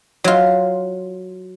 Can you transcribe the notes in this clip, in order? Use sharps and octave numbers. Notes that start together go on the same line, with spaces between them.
F#3 F4